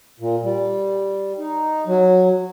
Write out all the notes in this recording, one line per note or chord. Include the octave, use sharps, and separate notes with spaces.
A#2
G3
D#4
F#3